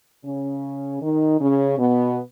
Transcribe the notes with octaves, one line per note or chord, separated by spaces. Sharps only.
C#3 C#4
D#3 D#4
C#3 C#4
B2 B3